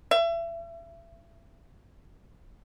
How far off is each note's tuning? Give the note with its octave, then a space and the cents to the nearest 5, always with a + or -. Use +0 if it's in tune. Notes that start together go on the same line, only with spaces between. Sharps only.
E5 +30